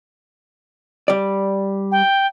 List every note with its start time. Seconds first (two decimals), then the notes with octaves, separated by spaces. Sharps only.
1.08 G3 D5
1.92 G5